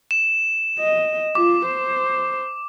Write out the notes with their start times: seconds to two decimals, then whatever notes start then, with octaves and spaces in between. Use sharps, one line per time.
0.11 E7
0.79 D#5
1.35 F4 D6
1.66 C5